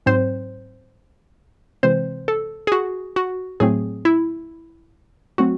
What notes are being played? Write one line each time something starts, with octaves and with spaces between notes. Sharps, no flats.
G#2 F#3 C4 C5
C3 E3 G#3 C4 C5
A4
G#4
F#4
F#4
A2 F#3 A3 C4 G#4
E4
F#3 A3 C4 F#4